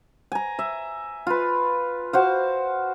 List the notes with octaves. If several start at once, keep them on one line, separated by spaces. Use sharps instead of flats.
G#5 A#5
E5
F4 B4
F#4 C5 F5